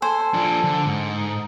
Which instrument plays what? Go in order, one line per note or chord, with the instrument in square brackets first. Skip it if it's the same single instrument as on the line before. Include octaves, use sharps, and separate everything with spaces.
[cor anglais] A4 [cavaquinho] C5 G#5
[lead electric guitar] F3 D4
D3
G#2
[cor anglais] D#4